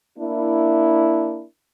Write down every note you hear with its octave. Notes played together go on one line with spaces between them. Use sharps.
A#3 D4 E4